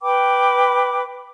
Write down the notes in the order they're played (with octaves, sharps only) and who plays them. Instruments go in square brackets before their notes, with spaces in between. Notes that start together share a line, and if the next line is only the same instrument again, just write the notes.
[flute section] B4 G5 B5 D6